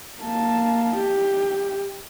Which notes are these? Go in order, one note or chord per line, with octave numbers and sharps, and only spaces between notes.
A#3 A5
G4